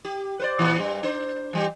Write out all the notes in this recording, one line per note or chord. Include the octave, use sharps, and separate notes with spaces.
G4
B4 C5 D5
A#2 E3
G2 G3
D4 C5
E3 G3 G4